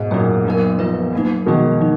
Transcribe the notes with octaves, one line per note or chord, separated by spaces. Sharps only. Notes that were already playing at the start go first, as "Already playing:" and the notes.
Already playing: G#2 B2
F#2 A#2 A#3 D#4 G#4
F#3 B3 D#4 A#4
F3 B3 F4 B4
F#3 A#3 D#4
B2 D#3 F3 G#3 D#4 G#4
F3 G#3 D#4